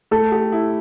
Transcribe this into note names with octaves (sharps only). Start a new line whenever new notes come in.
A3 A4
G4
E4